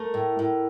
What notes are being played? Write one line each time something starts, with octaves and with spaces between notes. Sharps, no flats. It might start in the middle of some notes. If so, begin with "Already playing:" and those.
Already playing: A3 A#4
A2
A2